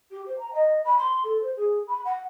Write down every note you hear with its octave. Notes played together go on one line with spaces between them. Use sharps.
G4
C5
A#5
D#5
B5
C6
A4
C5
G#4
B5
F#5